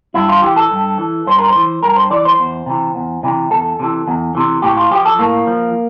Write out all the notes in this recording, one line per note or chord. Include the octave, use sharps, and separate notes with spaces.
G2 E4
F4
E3 G4
A4
G2
E3
G2 C5
A#4
C5
E3
G2 A#4
C5
E3 D5
C5
E2
C3 E3
E2
C3 E3
E2 A4
C3 E3
E2
C3 E3
A2 G4
F4
F3 G4
A4
A2 A#3
F3